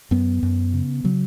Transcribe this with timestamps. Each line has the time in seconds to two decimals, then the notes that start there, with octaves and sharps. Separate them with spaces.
0.11 F#2 B3
0.43 F#2
0.73 C#3
1.04 C#3 F#3